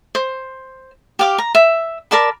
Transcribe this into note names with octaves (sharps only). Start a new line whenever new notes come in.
C5
G4 F5 D6
A#5
E5
A#4 D5 A5 B5